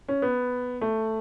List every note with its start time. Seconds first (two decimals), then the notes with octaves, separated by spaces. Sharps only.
0.08 C#4
0.22 B3
0.81 A3